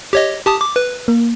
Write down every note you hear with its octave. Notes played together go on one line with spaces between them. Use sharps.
G4 C#5 D#5
G4 A5 D#6
D6
B4
A#3